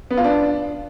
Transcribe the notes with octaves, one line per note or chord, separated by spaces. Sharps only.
B3
F4
D4